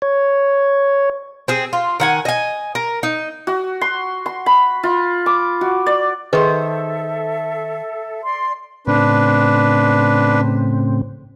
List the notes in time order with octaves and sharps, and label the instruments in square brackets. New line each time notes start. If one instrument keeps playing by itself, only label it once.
[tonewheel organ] C#5
[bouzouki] C4 G#4
F4
D#3 F#5 G#5
D#5 G#5
A#4
D#4
[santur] F#4
C6
C6
B5
F4
D6
F#4
D5
[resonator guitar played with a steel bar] D#3 C5 [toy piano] G#4 B4 [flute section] A4 [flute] E5
[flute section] D5 C6
[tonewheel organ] A2 C#3 C4 [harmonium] D4 B4